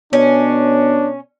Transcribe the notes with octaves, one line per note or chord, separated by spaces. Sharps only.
B2 C#4 D4